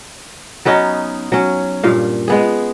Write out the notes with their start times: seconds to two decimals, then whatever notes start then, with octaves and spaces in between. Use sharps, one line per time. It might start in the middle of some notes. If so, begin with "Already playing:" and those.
0.65 F#3 B3 C#4 D#4
1.32 F#3 C#4
1.83 G2 A#2 F5
2.28 G#3 B3 G#4